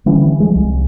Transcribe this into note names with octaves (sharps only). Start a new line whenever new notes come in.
D3 E3 G3 C#4
F3 G#3
C2